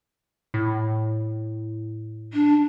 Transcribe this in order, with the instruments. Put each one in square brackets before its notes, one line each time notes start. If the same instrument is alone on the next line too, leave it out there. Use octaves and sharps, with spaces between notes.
[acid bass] A2
[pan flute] D4